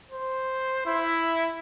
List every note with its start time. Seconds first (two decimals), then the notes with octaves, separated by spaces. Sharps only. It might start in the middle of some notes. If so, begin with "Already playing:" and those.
0.11 C5
0.86 E4